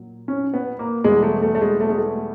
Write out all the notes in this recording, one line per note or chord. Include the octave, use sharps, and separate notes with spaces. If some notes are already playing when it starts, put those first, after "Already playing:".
Already playing: A#2 F#3
C#4
B3
A#3
E2 B2 G3 G#3
A3
A3
A3
G#3
A3
G#3
A3